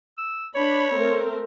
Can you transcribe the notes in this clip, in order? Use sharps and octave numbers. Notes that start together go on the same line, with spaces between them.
E6
D4 C#5 B5
A3 C4 A#4